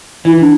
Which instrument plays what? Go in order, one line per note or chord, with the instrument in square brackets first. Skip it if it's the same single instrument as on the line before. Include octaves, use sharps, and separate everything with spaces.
[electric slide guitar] E3 [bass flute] E4
[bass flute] D4